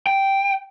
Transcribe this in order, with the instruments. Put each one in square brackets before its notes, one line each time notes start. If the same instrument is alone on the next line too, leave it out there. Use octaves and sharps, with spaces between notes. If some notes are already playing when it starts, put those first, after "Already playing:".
[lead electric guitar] G5